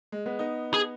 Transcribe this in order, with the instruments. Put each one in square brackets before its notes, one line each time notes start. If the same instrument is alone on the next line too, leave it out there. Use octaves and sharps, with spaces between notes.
[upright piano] G#3
G#3 B3
B3 D#4
[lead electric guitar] G#4